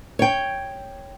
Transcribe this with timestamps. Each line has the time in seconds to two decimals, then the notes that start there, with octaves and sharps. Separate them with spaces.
0.19 C#5 G5